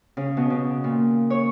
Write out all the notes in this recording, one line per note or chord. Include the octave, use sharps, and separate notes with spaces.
C#3
B2
C#3
A#2
C#5